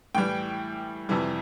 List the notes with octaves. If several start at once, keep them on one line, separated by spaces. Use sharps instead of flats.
A2 E3 G3 G5
F2 C3 E3 G3